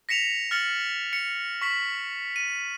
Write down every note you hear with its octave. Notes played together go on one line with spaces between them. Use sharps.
A#6 B6 C#7 E7 F7
F6 A6 C#7 F#7
C#7
C#6 B6 F#7
D#7